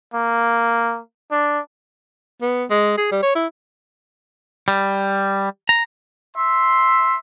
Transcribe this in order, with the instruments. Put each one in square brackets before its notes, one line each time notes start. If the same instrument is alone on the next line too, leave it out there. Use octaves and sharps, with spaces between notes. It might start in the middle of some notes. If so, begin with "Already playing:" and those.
[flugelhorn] A#3
D4
[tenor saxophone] B3
G#3
G#4
G3
C#5
E4
[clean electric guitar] G3
A#5
[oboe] E5 [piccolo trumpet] C6